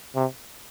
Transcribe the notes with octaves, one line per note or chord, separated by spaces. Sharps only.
C3